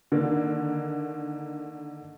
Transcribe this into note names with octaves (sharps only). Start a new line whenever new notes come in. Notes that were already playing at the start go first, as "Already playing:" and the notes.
D3 D#3 A#3